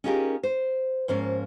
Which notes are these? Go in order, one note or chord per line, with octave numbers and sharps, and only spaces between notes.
C#4 D#4 F4 G4 G#4 A#4
C5
G#2 F3 A#3 C#4